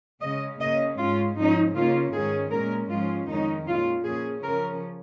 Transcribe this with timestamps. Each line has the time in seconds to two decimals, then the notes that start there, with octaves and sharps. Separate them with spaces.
0.21 C#3 G#3 C#4 D#5
0.60 C#3 A#3 C#4 D#5
0.98 G#2 G#3 C#4 F4
1.37 G#2 F3 C#4 D#4
1.74 C#3 A#3 C#4 F4
2.13 G#2 D#3 C#4 G#4
2.51 A#2 G#3 C#4 A#4
2.89 G#2 F3 G#3 C#4 F4
3.27 F2 D#3 G#3 C#4 D#4
3.66 A#2 G#3 C#4 F4
4.05 A#2 F3 C#4 G#4
4.42 C#3 F3 C#4 A#4